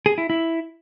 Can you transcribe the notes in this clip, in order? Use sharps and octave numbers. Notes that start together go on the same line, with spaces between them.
G#4
E4
E4